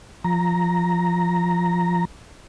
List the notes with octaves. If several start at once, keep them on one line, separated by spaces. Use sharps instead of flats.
F3 A#5